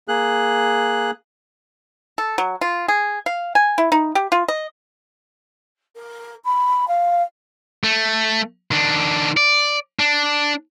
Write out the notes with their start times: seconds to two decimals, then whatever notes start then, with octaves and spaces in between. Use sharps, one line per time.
0.08 A#3 G#4 F#6
2.18 A4
2.38 F#3
2.61 F4
2.88 G#4
3.26 F5
3.55 G#5
3.78 E4
3.92 D#4
4.15 G4
4.32 F4
4.48 D#5
5.95 A#4
6.44 B5
6.87 F5
7.84 A3
8.71 D#3 D4
9.37 D5
9.99 D4